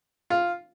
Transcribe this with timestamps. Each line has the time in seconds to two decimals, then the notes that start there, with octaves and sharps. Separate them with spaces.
0.30 F4